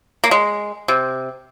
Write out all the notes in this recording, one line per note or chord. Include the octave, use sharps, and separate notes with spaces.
A#3
G#3
C3